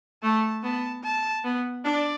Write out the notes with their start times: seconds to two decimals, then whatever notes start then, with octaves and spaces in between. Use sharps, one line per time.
0.23 A3 A5
0.63 B3 A5
1.03 A5
1.44 B3
1.84 D4 D5